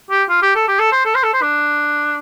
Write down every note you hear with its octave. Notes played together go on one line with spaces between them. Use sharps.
G4
F4
G4
A4
G4
A4
C5
A4
C5
A4
C5
D4